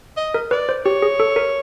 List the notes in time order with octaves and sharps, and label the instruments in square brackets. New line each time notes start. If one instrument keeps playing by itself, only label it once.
[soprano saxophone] D#5
[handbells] A#4
[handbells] B4 [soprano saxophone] D5
[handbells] C5
[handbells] G4 [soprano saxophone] C#5
[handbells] G#4
A4
A#4